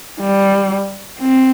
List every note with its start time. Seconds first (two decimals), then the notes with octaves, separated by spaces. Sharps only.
0.20 G3
1.20 C4